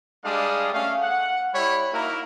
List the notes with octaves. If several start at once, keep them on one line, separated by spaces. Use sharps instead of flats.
G3 G#3 D4 F5 D#6
A3 C#4 F5
F#5
G3 E4 C#5 B5
A#3 D#4 E4 F#4 A#4